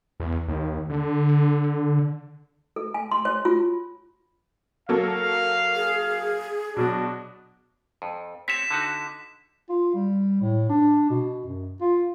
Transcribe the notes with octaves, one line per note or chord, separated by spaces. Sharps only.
E2
D#2
D3
A4
G#5
C6
C#5
F4
F#3 A#3 A4 F5
G#4
B2 F#3 D4
F2
C4 G4 C#5 B6 E7
D3 D#4 F#4
F4
G3
A2
D4
B2
F#2
F4